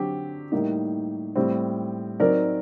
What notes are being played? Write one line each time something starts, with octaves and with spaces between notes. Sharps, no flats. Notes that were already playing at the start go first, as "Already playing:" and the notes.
Already playing: D3 F#3 C4 G4
A2 G3 A#3 D#4
A2 G3 C4
F#3 C4 D#4 A#4 D5